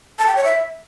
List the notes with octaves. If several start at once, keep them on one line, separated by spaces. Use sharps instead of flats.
A5
G5
C#5
E5